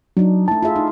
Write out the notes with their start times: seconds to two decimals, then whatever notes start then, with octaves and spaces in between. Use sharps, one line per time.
0.17 F#3 D4 D#4
0.48 A3 E4 A5
0.62 F4 G#4 E5
0.76 D#4